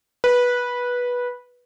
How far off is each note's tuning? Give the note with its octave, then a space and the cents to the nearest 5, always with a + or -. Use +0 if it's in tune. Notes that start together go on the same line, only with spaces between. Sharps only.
B4 -15